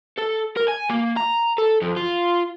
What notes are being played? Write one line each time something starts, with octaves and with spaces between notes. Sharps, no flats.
A4
A#4
G#5
A#3
A#5
A4
F2
F4